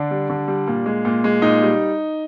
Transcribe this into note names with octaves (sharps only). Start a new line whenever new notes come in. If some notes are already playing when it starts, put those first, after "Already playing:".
Already playing: D3 D4
G3
D3
G3
A#2
G#3
A#2
G#3
A#2 D#4
G3